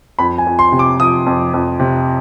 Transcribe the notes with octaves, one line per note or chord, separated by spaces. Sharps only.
F2 B5
G#5
F2
C6
C3
D6
F3 D#6
F2
F2
C3